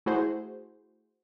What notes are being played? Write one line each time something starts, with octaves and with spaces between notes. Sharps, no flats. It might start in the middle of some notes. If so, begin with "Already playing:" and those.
A3 E4 F#4 G#4 C5